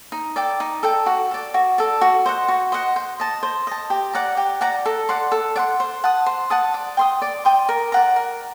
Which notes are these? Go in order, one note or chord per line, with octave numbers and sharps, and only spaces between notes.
D#4
A4 D5 G5
D#4
A4 D5 G5
F#4
A4 D5
F#4
A4 D5
F#4
C5 D#5 F#5
F#4
C5 D#5 F#5
C5
D#5 A5
C5
D#5 A5
G4
D5 F#5 A#5
G4
D5 F#5 A#5
A4
D5 F#5 C6
A4
D5 F#5 C6
C5
F#5 A5 D#6
C5
F#5 A5 D#6
D5
G5 C6 D#6
D5
G5 C6 D#6
A#4
D5 F#5 A#5
A#4